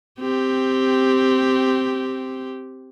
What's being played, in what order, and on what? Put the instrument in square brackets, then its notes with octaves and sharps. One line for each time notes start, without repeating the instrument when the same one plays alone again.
[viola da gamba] C4 G4